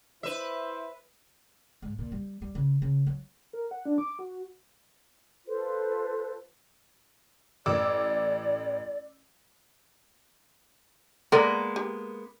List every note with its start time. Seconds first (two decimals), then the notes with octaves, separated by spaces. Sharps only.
0.23 E4 B4 C5 E5
1.82 G#2
1.99 A#2
2.12 G3
2.42 G3
2.55 C#3
2.82 C#3
3.07 F#3
3.53 A#4
3.71 F#5
3.86 D4
3.98 D6
4.19 F#4
5.46 F4 A4 B4 C5
7.66 A1 D5 D6 E6
11.32 G#3 A#3 B3 A4 A#4 D5
11.76 G4